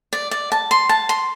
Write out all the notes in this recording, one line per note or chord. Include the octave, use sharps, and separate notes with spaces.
D5
D5
A5
C6
A5
C6